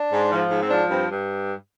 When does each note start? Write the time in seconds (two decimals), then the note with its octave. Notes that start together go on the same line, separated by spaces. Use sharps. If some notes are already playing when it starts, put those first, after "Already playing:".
Already playing: D4
0.12 G#2
0.32 F3
0.51 G#2
0.62 C4
0.70 F3 D4
0.90 G2 C4
1.09 G2